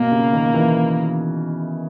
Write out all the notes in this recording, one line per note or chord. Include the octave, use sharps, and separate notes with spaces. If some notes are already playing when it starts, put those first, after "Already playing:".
Already playing: B2 A#3
C#3
D#3
E3